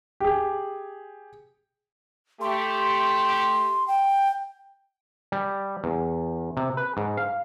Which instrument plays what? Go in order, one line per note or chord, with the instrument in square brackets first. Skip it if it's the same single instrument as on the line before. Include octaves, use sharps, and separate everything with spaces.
[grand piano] G4 G#4
[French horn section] A3 G4 [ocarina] C6
[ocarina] G5
[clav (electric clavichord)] G3
E2
C3
B4
G#2
F5